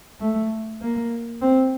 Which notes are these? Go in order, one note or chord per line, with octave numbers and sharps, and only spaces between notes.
A3
A#3
C4